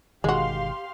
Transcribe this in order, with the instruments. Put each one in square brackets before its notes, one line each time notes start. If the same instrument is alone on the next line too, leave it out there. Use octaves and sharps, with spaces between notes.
[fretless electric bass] G1 B2 D#3 [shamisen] G#3 F#4 [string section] G4 F5 C6